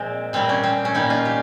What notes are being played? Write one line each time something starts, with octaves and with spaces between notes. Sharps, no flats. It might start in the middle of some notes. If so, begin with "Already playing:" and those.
Already playing: A#2 F3 G#3 C4
A#2 G3 A#3 C4
C#4
C4
C#4
A#2 G3 A#3 D#4
F4
G4